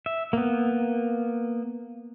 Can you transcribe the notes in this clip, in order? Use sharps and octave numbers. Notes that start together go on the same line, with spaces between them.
E5
A#3 B3